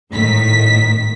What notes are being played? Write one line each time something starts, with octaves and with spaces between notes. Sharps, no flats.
G#1 A2 D#3 B6